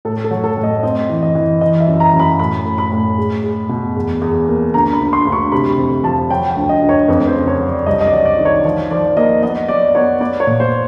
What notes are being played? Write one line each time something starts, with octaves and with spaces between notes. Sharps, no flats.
A2 A4
A4
F#3
A4
A2
D#5
C4 D#5
E3
D#5
E3
E3 D#5
E5
F#2
A#5
F#2
B5
A2 B5
A2
B5
A2
G#3
G#3
B2
E2
E2
A#3
D2 A#5
B5
D2
C6
D2
C#6
C3 B5
F2
F3 A5
F#3 G5
G5
D2
D#5
D2
C#5
F2 B4
C5
C#3
C#5
F#3
D5
C2 D#5
D#5
D5
F#3
D5
D#3
C#5
F3
F3 D5
A#3 D#5
B3 D#5
F#3 D5
B3 C#5
B3 D5
C#5
A#2
C5